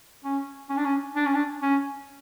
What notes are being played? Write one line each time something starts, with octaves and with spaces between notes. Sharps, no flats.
C#4
C#4
D4
C#4
D4
C#4
D4
C#4